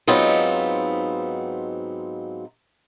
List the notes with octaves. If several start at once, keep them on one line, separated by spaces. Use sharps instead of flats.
G#2 F#3 B3 C4 D#4 F4